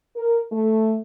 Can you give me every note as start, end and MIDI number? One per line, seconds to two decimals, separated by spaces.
0.16 0.41 70
0.51 0.97 57